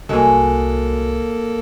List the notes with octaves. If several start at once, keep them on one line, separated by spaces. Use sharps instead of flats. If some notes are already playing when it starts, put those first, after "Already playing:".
C2 F#3 G#3 A#3 G#4 A4